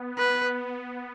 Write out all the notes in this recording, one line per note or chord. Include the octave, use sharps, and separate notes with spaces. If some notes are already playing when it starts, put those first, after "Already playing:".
Already playing: B3
B4